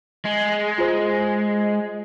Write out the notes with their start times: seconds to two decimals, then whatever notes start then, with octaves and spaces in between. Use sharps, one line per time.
0.25 G#3
0.78 F4 C5